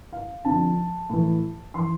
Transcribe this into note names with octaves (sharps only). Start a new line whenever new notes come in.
F5
F2 D3 F3 A5
A2 E3
E3 C6